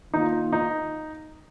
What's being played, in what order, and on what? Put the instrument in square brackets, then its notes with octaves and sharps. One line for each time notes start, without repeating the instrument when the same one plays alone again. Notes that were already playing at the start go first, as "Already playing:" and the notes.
[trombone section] D#3 A#3 F4 [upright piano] D#4
[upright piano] D#4